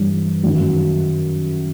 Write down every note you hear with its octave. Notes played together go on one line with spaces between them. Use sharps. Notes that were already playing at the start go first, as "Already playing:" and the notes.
Already playing: G2 E3 G3
F#2 D#3 F#3